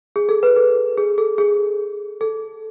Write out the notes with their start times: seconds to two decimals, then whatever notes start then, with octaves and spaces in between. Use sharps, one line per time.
0.16 G#4
0.29 A4
0.43 B4
0.57 A4
0.98 G#4
1.18 A4
1.38 G#4
2.21 A4